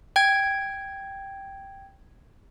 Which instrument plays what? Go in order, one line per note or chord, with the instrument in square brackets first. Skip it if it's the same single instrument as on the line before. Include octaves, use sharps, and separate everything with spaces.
[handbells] G5 G#6